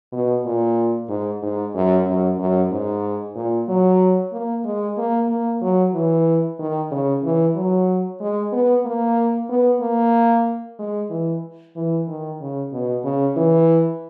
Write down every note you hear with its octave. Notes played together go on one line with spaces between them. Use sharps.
B2
A#2
G#2
G#2
F#2
F#2
F#2
G#2
A#2
F#3
A#3
G#3
A#3
A#3
F#3
E3
D#3
C#3
E3
F#3
G#3
B3
A#3
B3
A#3
G#3
E3
E3
D#3
C#3
B2
C#3
E3